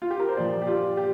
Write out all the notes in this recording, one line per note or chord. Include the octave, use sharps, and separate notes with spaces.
F4
G4
A#4
C5
A#2 F3 D5
G4
F4
G4